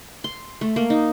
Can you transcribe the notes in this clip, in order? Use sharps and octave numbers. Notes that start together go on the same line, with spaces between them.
C6
A3
A#3
D#4